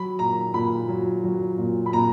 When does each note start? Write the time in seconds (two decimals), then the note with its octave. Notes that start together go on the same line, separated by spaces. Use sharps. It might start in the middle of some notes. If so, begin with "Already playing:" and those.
Already playing: F#3 B5
0.19 A#2 A#5
0.54 A#2 B5
0.89 F#3
1.24 F#3
1.58 A#2
1.86 B5
1.93 A#2 A#5